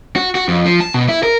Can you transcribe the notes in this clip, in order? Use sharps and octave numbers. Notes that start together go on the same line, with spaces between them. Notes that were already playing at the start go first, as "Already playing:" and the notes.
F#4
F#4
F2
F3
A5
B2
E4
A#4